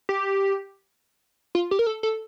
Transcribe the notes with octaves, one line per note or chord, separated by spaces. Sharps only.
G4
F4
G4
A#4
A4
A4